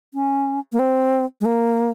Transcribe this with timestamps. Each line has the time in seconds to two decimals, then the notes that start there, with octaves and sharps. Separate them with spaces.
0.14 C#4
0.72 A#3
0.79 C4
1.41 G#3
1.45 A#3